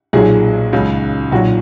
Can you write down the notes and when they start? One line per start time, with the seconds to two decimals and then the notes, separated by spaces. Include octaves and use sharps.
0.13 B1 A#2 F#3 G#4
0.73 C#2 C#3 F#3
1.32 B1 A#2 F#3 F#4